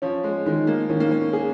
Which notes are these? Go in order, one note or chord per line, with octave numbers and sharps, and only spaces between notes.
F3 C#4
G#3
D#3 G#3
A#3
D#3 C#4
A#3
C#4
G#4